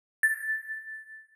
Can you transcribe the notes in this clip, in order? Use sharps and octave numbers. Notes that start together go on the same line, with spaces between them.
A6